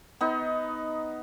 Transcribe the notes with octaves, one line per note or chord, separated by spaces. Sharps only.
B3 D#4